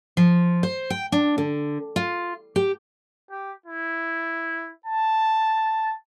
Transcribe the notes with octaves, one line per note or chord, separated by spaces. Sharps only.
F3
C5
G5
D4
D3
F4
G4
G4
E4
A5